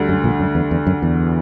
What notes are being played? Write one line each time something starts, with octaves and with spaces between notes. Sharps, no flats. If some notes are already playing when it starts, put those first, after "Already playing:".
Already playing: D2 D3 G3
F#2
A#1 A#2
F#2
E2
E2
F#2
E2